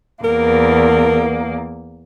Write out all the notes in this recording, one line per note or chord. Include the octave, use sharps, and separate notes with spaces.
E2 A#3 A#4